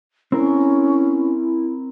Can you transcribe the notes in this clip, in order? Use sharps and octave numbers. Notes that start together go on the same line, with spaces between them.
C4 C#4 E4 A#4